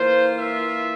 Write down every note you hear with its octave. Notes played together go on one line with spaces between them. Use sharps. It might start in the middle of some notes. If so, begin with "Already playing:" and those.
Already playing: E3 A#3 F4 C5
E5